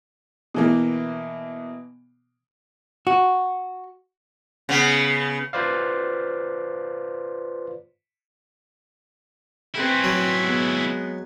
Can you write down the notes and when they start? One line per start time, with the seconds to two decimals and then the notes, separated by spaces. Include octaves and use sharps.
0.54 B2 E3 A#3
3.07 F#4
4.69 C#3 B3
5.53 F4 B4 C5 D5 F5
9.74 C4 C#4 E4 B4
10.04 F#3
10.40 G#3 B3